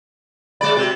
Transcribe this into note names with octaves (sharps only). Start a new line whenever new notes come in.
G#3 G#4 D5 B5
C3 F#4